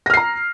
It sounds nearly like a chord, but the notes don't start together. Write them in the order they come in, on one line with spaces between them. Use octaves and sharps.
A#6 F6 C7 A#5